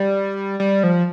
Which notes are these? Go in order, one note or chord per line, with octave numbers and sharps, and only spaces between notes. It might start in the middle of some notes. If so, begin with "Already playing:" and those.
Already playing: G3
G3
F3